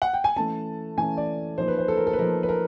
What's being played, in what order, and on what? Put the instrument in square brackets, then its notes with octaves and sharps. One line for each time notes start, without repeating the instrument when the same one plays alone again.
[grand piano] F#5
G5
G#5
E3 A3 C#4 A5
E3 A3 C#4 G#5
D5
F3 A#3 D#4 C5
B4
C5
A4
A#4
A4
B4
F3 A#3 D#4 A#4
B4
A#4